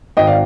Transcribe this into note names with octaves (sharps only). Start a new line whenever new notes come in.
G#1 D#5 G5
D5 F5